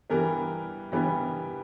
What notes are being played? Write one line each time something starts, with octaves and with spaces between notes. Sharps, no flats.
G2 E3 G3 B3 A#4
G2 E3 G3 B3